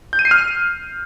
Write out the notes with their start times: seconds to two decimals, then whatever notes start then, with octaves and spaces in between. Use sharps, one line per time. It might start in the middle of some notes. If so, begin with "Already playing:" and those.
0.13 G6
0.19 D#7
0.25 C7
0.31 F6